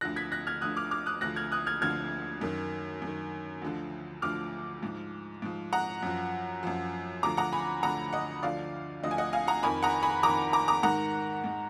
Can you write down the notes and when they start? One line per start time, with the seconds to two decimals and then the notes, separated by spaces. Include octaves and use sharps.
0.01 D2 D3 F3 F#6 A#6
0.16 G#6 B6
0.32 F#6 A#6
0.47 F6 G#6
0.61 D2 D3 F3 D#6 F#6
0.77 D6 F6
0.91 D6 F6
1.06 D#6 F#6
1.21 D2 D3 F3 F#6 A#6
1.36 F6 G#6
1.52 D#6 F#6
1.67 F6 G#6
1.81 D2 D3 F3 F6 G#6
2.41 F#2 D#3
3.02 F#2 D#3
3.62 D2 D3 F3
4.22 D2 D3 F3 D6 F6
4.83 G#2 F3
5.42 G#2 F3
5.73 F#5 A#5
6.02 F#2 F3
6.63 F#2 F3
7.23 D2 D3 F3 A#5 D6
7.37 F#5 A#5
7.52 G#5 B5
7.83 D2 D3 F3 F#5 A#5
8.13 D#5 F#5
8.43 D2 D3 F3 D5 F5
9.03 D2 D3 F3 D#5
9.11 G#5
9.18 D#5 F#5
9.33 F5 G#5
9.48 F#5 A#5
9.63 F2 D#3 G#5 B5
9.83 F#5 A#5
10.03 G#5 B5
10.23 F2 D#3 A#5 D6
10.53 A#5 D6
10.68 A#5 D6
10.83 G#2 D#3 F#5 A#5
11.44 G#2 D#3